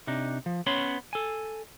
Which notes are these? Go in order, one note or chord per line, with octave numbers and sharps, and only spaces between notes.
C3 D4 D#4
F3
B3 C#4 C#5 B5 C6
A4 G#5